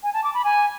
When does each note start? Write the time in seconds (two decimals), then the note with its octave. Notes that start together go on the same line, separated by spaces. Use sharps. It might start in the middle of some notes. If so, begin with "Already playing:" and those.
0.03 G#5
0.14 A5
0.24 D6
0.34 B5
0.44 G#5